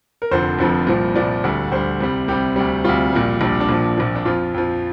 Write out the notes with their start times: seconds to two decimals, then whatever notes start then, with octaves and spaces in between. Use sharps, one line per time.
0.22 A#4
0.31 F1 F2 D3 F3 C5
0.59 F1 F2 D3 F3
0.87 C2 A#2 F3
1.15 C2 A#2 F3 D5
1.44 D2 D3 G3
1.71 D2 D3 G3 C5
2.01 C2 C3 G3
2.28 C2 C3 G3 G4
2.56 D2 C3 G3
2.84 D2 C3 G3 F4
3.13 A#1 A#2 G3
3.41 A#1 A#2 G3 D4
3.60 D4
3.69 A#1 A#2 F3
3.98 A#1 A#2 F3
4.15 D4
4.25 F2 F3 F4
4.54 F2 F3